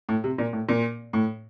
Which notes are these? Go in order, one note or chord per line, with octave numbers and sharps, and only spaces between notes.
A2
C3
A#2
A2
A#2
A2